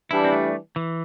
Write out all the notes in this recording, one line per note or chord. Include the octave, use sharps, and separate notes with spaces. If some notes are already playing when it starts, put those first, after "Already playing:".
E3 G3 D4 E4
C4
A3
E3